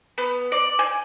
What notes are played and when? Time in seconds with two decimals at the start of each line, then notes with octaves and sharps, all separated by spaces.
0.18 B3
0.52 D5
0.79 G#5